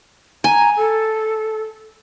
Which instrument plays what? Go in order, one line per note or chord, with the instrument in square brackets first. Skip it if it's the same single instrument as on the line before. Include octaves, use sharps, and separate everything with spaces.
[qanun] G#5 [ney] A#5
[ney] A4